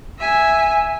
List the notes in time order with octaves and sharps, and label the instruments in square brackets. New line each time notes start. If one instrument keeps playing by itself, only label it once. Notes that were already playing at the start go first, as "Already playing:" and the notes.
[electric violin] E5 G#5